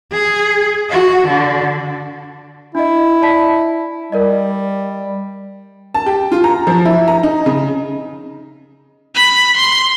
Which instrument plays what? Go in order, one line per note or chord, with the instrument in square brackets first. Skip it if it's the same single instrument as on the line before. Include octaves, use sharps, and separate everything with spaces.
[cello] G#4
F#4
D3
[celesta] D4 D#5 [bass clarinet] E4
[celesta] D5 A5 B6
[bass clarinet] G3 [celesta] A#4 D5 D#5
[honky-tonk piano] A5
G4
F4
A#5
F3
E4
A#5
D#4
C#3
[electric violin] B5
C6